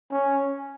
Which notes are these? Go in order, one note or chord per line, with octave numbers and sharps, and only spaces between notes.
C#4